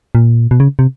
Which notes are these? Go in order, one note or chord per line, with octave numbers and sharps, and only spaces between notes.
A#2
B2
C#3
C3